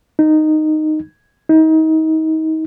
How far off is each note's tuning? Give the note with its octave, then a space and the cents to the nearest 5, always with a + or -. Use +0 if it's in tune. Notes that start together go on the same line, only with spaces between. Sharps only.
D#4 -10
D#4 +30